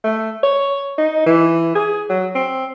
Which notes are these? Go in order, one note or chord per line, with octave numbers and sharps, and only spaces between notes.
A3
C#5
D#4
E3
G#4
F#3
C4